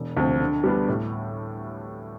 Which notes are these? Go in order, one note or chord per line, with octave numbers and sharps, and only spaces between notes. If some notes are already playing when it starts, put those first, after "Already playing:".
Already playing: E1
D2 C3 F3
D3
G3 B3 D4
A2